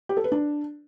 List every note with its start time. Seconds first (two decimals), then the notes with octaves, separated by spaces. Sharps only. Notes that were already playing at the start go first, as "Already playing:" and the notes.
0.09 G4
0.17 A4
0.24 B4
0.32 D4